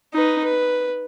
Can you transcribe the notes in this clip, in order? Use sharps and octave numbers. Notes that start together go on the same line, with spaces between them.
D#4 B4
B4